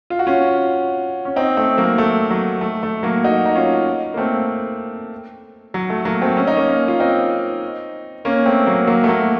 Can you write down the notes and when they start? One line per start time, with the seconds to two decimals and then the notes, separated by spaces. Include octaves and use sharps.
0.10 F4
0.19 F#4
0.27 C#4 F4
1.25 C#4
1.36 C4 D#4
1.57 A3 C4
1.77 F#3 A#3
1.98 A3
2.30 F#3
2.61 A3
2.83 A3
3.03 F#3 A#3
3.24 D#4 F#4
3.45 D#4
3.55 C#4 F4
4.14 A#3
4.17 A3 C4
5.74 F#3
5.90 A3
6.05 F#3 A#3
6.22 A3 C4
6.37 C#4
6.47 D#4
6.57 A#3 C#4
6.69 A#3 C#4
6.88 F4
7.00 C4 D#4
8.25 A#3 C#4
8.45 A3 C4
8.66 F#3 A#3
8.87 F#3 A#3
9.04 A3
9.08 F#3 A#3